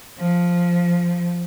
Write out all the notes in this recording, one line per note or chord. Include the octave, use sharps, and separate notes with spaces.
F3